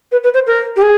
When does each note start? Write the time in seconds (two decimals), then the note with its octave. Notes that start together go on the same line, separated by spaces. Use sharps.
0.12 B4
0.24 B4
0.34 C5
0.47 A#4
0.76 G4
0.82 G#4